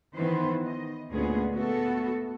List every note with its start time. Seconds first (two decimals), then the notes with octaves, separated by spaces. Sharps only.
0.15 D#3 E3 B3 B4 C5
0.64 D#5
1.11 D2 A#2 G#3 B3 C#4 G#4
1.55 A3 B3 F#4 A4